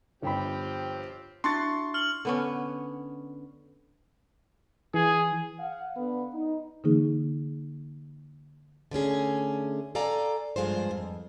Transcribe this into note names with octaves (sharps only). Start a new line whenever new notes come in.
G1 F3 C4 G4 G5 B5
D4 E4 F#4 C6 C#6 A6
F6 F#7
D3 B3 C#4
E3 G#4
F5 F#5
D3 B3
D#4
D3 E3 A#3 D#4 G#4
D3 A3 C#4 G#4
A4 D5 F5 G#5 A#5
G2 F3 G#3 F4 C5
F2